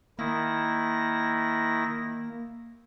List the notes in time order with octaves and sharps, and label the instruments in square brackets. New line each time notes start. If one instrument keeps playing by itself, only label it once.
[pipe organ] D#3 E4 A#6 [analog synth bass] A#3